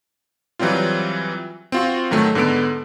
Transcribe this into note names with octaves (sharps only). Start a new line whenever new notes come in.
E3 F#3 G3 C4 F4
C4 F4 F#4
G#2 D#3 F#3 A3
G#2 D3 B3 A4 D7